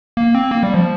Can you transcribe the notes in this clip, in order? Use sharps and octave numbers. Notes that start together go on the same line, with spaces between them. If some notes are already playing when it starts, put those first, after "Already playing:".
A#3
C4
A#3
G3
F3